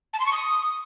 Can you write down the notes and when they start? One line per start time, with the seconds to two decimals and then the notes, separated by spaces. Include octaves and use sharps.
0.13 A5
0.20 C6
0.26 C#6
0.33 D#6